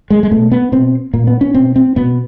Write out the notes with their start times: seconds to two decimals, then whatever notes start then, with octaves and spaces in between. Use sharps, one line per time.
0.10 G#3
0.23 G#3
0.31 B2 A3
0.52 B3
0.72 B2 C4
1.13 A#2 A#3
1.27 B3
1.41 C#4
1.55 B2 C4
1.76 C4
1.96 B2 B3